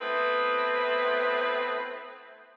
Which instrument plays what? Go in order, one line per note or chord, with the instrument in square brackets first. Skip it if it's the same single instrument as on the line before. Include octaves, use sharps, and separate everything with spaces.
[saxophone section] A3 B3 C4 E4 B4